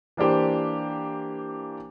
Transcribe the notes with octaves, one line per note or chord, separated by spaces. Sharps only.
E3 A#3 D4 G4 C5